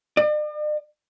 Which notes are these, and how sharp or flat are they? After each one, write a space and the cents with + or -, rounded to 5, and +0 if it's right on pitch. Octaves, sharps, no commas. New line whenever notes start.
D5 +45